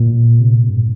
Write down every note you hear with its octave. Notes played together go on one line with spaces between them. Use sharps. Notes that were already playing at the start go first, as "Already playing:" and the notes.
Already playing: A#2
C3
A#2
G2